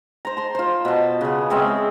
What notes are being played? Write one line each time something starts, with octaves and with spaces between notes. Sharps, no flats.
C5 A#5
A5 C6
F4 C5
B2 A5
C#3 B3
G#3 C4 C#4 E5